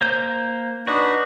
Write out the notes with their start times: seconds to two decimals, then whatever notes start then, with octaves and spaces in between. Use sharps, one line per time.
0.01 A#3 C5 G6
0.87 D4 D#4 F#4 B4 F#6